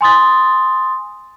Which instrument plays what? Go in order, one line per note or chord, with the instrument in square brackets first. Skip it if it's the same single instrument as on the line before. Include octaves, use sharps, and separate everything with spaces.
[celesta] G#5 C6 D#6 A6